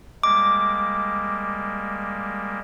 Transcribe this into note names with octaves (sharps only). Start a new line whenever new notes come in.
G3 G#3 A#3 D6